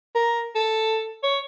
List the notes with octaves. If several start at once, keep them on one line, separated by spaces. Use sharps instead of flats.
A#4
A4
C#5